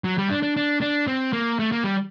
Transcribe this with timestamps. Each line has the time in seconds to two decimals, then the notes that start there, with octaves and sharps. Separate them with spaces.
0.04 F#3
0.18 G3
0.30 D4
0.43 D4
0.57 D4
0.81 D4
1.07 C4
1.33 A#3
1.59 A3
1.72 A#3
1.84 G3